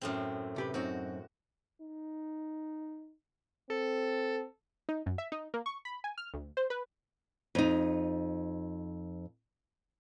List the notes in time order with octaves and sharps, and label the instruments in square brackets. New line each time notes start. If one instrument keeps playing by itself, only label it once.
[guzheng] F#2 A2 C4
[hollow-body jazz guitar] C3 G4 B4
[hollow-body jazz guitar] F#2 C4 D#4 [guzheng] F#4
[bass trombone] D#4
[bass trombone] C4 [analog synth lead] A4
[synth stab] D#4
F#2
E5
D#4
A#3
C#6
B5
G#5
F6
D2
C5
B4
[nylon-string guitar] F2 D#4